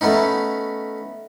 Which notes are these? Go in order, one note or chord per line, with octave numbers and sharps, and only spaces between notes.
A3 B3 C#4 D#4